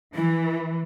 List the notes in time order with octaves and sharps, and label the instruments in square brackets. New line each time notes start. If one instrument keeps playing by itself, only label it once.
[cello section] E3 [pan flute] E4